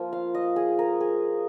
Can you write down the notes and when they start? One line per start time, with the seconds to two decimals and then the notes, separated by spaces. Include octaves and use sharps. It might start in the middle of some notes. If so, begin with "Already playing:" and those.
Already playing: F3 A#3 F4
0.13 F5
0.34 D#5
0.56 G#4
0.79 A#4
1.01 G#4